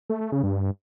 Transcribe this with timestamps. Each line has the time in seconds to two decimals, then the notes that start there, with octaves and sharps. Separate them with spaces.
0.10 A3
0.21 A3
0.32 C#3
0.43 G2